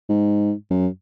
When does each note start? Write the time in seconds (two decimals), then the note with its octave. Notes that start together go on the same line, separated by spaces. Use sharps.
0.09 G#2
0.71 F#2